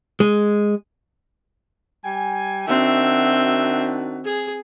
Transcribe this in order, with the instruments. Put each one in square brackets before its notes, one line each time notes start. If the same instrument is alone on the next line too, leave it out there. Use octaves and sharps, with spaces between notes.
[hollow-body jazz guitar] G#3
[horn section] G3 G5 G#5
[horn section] D#3 D4 F#4 [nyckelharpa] C4 E5
[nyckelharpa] G#4